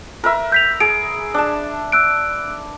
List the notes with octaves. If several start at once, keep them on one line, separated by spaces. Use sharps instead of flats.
A#4 B4 E5
G6 B6 F7
G#4 D7
D4 A5
E6 F#6 D7